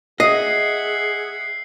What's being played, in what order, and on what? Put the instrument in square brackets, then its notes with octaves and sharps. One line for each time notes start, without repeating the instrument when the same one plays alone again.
[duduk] G#4 [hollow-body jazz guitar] D#5 [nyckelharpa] E5 F#5 [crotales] C7